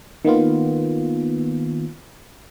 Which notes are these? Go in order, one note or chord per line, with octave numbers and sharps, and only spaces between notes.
D#3 A#3 B3 F4